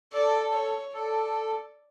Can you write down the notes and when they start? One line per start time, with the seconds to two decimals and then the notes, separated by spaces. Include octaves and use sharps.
0.13 A4 D5
0.53 C#5
0.94 A4 D5